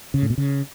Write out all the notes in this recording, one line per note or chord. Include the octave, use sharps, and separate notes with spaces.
C#3
A2
B2
C#3